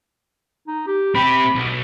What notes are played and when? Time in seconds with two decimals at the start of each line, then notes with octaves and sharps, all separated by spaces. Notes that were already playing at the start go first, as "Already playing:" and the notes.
0.68 D#4
0.87 G4
1.15 C4 G4 B5
1.55 B1